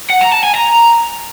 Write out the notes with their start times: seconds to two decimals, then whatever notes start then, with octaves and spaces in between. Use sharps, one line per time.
0.10 F#5
0.21 A#5
0.32 A5
0.43 G#5
0.54 A#5